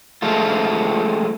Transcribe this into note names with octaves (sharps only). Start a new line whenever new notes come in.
F3 G#3 A3 F4